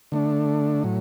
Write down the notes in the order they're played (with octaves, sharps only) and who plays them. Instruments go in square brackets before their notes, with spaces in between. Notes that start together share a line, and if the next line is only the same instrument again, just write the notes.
[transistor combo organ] D3 A3 D4
A2 F#3